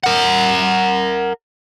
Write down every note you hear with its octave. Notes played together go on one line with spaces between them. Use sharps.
A#4 F#5